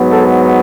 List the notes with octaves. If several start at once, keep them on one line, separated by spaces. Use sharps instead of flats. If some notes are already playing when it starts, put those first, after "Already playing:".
Already playing: G#2 F#3 B3
A4